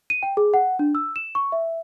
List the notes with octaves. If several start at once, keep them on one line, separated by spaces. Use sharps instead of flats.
D#7
G5
G#4
F#5
D4
E6
E7
C#6
E5